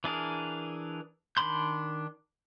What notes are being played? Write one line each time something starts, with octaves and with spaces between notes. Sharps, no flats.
E3 D4 G#4 A#4
D#3 D4 B5 C6 G6